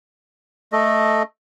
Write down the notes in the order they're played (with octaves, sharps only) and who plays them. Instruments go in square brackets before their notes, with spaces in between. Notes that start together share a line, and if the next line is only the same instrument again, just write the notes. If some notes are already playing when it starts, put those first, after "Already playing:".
[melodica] A3 A4 D#5